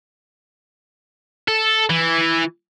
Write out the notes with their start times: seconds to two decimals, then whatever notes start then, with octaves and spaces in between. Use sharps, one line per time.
1.48 A4
1.90 E3